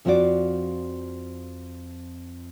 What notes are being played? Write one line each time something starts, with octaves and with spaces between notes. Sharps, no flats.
F2 F3 C4 D4 F#4 D5